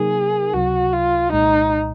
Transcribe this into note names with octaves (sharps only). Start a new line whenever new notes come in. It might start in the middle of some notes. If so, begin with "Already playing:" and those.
Already playing: C3 F#3 A#3 D#4 G#4 A#4
C#2 C3 F#3 F#4
F4
C2 A#2 G#3 D#4